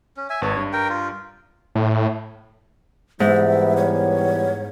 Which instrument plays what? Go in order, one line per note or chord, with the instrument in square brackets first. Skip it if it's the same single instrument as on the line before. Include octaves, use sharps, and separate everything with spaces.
[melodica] C#4
E5 G#5
[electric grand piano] G#1 B4 A5 [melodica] C#5
[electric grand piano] G2
[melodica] A#4 G5
F4
[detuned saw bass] A2
[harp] G#2 [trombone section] E3 G3 B3 [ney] E5
[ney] C#5